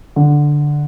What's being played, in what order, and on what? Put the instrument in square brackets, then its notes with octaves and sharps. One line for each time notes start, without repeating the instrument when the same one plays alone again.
[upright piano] D3